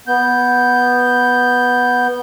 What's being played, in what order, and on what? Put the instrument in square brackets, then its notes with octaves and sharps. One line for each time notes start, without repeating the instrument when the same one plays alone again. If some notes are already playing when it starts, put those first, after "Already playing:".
[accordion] B3 G6